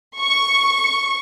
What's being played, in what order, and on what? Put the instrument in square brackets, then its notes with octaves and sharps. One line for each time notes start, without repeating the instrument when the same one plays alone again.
[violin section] C#6